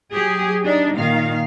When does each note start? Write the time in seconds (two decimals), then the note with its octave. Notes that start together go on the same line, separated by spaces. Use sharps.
0.12 F#3 G4 G#4
0.64 D4 D#4
0.95 A#2 D#3 F5